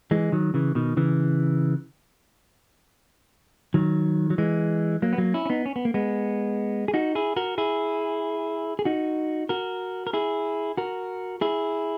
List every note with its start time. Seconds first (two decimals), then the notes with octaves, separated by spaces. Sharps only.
0.11 E3 G#3
0.32 D#3 F#3
0.54 C#3 E3
0.75 B2 D#3
0.97 C#3 E3
3.74 D#3 F#3
4.30 F#3
4.38 E3 G#3
5.02 F#3 A#3
5.13 B3
5.18 F#3 A#3
5.34 C#4 E4
5.46 C#4
5.50 B3 D#4
5.66 C#4
5.76 B3
5.85 A#3
5.94 G#3 B3
6.88 G#4
6.94 D#4 F#4
7.15 E4 G#4
7.36 F#4 A#4
7.58 E4 G#4
8.79 G#4
8.85 D#4 F#4
9.49 F#4 A#4
10.07 A#4
10.13 E4 G#4
10.77 F#4 A#4
11.41 E4 G#4